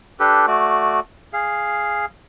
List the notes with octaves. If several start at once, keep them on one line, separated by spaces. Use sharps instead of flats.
D4 G4 A4 B4
A3 F#4 D5
G#4 F5